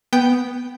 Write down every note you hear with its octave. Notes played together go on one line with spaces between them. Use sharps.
B3 G5 G6